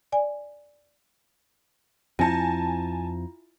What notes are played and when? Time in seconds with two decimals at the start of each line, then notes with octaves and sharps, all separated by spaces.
0.12 D5 G#5
2.19 F2 F3 C4 E4 F4 G#5 A5